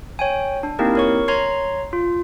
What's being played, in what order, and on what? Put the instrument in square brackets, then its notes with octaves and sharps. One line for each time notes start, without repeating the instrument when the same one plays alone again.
[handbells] C#5 G5 G#5
D4
A#3 C4 D#4 E4 G4 A#4
A#4 C#5 C#6
C#5 A#5 C6 G#6 C7
F4